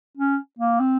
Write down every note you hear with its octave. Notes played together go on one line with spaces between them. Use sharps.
C#4
A#3
C4